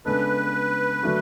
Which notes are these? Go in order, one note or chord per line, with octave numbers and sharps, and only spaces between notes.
C#3 G#3 B3 D4 A4 B4
D3 F#3 A3 D4 F#4